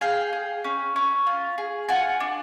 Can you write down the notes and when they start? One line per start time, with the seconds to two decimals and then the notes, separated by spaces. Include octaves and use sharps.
0.01 G#4 F5 G5
0.33 G#4
0.64 C#4
0.96 C#4
1.27 F4
1.58 G#4
1.88 F4 F#5 G#5
2.20 D4